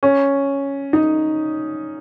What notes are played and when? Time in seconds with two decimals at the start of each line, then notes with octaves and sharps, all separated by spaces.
0.03 C#4
0.93 D#4